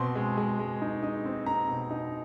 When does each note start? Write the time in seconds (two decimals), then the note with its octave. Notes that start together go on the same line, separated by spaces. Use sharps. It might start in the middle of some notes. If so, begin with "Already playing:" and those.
Already playing: B2 C4 C6
0.15 G#3
0.37 G#3
0.59 G#3
0.81 D#4
1.03 D#4
1.25 C4
1.46 C4 A#5
1.68 B2
1.90 D#4